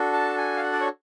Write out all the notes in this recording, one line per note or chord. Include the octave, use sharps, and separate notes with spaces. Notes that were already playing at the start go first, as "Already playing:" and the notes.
Already playing: D4 F#4 A4
A5
G#5
F5
F#5
D5
C#5